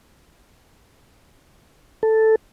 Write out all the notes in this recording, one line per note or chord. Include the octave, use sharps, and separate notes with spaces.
A4